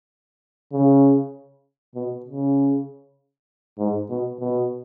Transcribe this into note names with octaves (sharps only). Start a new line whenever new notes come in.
C#3
B2
C#3
G#2
B2
B2